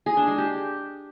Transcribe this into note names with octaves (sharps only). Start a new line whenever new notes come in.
G#4
D4
G#3
G4